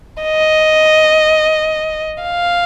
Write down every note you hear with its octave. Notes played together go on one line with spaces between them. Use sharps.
D#5
F5